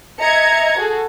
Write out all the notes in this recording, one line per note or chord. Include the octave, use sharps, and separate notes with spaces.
D#5 E5 A#5 G#6 C#7
F#4 G#4 A4